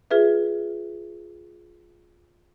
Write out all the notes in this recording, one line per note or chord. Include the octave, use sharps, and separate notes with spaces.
F4 G#4 B4 E5